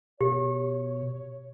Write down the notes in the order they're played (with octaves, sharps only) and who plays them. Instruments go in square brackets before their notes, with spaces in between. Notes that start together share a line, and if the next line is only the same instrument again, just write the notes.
[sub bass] B2 [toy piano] G4 [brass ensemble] C#5